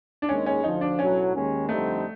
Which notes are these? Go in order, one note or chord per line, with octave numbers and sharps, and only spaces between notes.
D4
D#2 D#3 G#3 C#4
C#4
D2 D3 F3 D#4
D4
B1 A2 F#3 C#4
D#2 D#3 G#3 C#4
F2 D3 G3 A3 C4 D#4